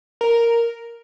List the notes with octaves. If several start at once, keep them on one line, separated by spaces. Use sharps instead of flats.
A#4